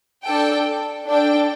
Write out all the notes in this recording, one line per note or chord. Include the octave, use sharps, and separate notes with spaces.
D4 A4 G5
D4 A4 G5